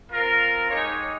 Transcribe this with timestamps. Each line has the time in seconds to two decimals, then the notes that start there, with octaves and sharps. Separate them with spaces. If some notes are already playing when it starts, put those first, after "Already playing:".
0.12 C4 F4 A#4
0.70 G#3 D#4 G4 C#5